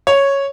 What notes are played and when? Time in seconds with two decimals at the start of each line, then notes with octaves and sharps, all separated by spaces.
0.07 C#5